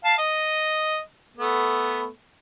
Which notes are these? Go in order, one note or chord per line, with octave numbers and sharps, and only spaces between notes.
F5 A5
D#5
A3 B3